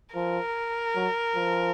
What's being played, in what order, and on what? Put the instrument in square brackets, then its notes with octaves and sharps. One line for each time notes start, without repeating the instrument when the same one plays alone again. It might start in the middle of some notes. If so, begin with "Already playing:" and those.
[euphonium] F3 [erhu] A#4
[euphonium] F#3
F3